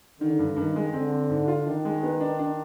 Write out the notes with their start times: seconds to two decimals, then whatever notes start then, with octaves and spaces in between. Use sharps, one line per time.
0.20 D3 D#3
0.39 G2
0.56 G2 D#3
0.76 G#3
0.93 D3 C4
1.12 C4
1.30 G#2
1.48 F4
1.66 D#3 D4
1.85 G#3
2.03 B3
2.21 D4
2.39 D4